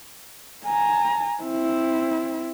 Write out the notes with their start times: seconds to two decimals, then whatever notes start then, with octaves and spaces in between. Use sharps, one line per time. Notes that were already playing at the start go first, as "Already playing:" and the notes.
0.65 G#5 A#5
1.43 C4 E4